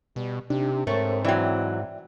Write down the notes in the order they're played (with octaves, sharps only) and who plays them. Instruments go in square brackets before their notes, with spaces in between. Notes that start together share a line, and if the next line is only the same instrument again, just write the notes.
[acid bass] B2 [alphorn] G3
[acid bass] C3 [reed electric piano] D4 D#4 [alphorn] G4
[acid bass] G#2 [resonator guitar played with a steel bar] A3 [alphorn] C4 [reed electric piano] A#4 C#5
[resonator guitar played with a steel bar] E3 F#3 [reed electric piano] D5 E5 G5